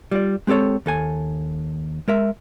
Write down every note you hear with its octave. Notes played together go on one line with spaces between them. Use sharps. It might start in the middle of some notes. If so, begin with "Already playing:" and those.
G3 F4 D5
G#3 C4 G4 A4 C#5
D#2 A4 G#5
G#3 A#4 E5